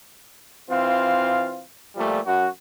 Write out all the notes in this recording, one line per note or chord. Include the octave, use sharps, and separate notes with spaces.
E3 C4 F4 F5
A#2 F3 G3 A3
F#2 F#4